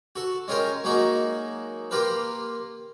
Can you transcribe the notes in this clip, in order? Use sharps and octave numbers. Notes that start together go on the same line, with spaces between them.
F#4 A4
G#3 C#4 F4 G4 A#4
F#3 G#3 A#3 D#4 F#4
A#3 F4 G4 A#4 B4